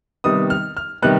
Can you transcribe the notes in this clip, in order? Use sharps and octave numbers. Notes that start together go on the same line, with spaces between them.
C3 D#3 G3 B3 D#6
F6
F6
C3 D#3 G3 B3 F#6